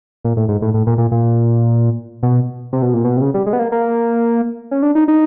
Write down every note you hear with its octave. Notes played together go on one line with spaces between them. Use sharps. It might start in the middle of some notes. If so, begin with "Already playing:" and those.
A#2
A2
G#2
A2
A2
A#2
A#2
A#2
B2
C3
B2
A#2
B2
C3
C#3
G3
G#3
B3
A#3
A#3
C#4
D4
D#4
D#4